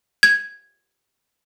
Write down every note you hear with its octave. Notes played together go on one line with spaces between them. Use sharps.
G#6